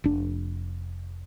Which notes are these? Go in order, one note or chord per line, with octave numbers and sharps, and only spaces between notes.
F1 D4